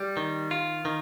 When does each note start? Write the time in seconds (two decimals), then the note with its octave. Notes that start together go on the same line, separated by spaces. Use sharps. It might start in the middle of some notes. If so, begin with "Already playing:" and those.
Already playing: G3
0.17 D#3
0.51 F4
0.85 D#3